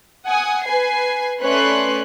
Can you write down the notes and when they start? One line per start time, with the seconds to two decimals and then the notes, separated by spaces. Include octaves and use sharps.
0.25 F#5 G#5 D#6
0.64 B4 G#5 C7
1.42 A3 C#4 B4 D5 C6 F#6